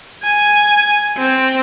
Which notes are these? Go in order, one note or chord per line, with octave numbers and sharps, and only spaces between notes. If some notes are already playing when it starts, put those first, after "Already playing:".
G#5
C4